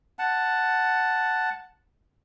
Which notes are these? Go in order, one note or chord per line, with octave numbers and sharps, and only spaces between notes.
F#5 A5